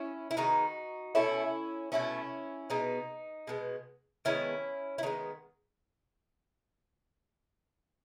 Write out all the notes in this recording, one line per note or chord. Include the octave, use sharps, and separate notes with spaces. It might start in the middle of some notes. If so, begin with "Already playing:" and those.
Already playing: C#4 E4
E4
D#3 G#3 B3 D#4 F#4
B2 A3 C#4 E4
B2 A3 C#4 E4
B2 G#3 B3 D#4
B2 G#3 B3
D#3 G#3 B3 C#4 E4
E4
D#3 G#3 B3 D#4